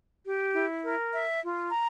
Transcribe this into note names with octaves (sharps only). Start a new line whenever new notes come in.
G4
E4
A#4
E5
F4
A#5